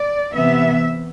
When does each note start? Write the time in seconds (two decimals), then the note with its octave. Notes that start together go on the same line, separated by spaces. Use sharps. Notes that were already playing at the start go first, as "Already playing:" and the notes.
Already playing: D5
0.32 C3 E3 B3 E5